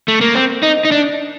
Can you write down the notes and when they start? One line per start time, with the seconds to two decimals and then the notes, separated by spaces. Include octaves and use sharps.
0.08 A3
0.21 A#3
0.35 C4
0.63 D#4
0.85 D#4
0.92 D4